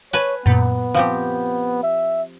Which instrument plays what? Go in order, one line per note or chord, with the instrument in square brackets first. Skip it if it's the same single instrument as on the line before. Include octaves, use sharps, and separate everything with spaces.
[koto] B4 G#5 A5 [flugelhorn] C#5
[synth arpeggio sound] F#2 A#2 [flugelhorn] B3
[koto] F3 C4 G4
[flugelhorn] E5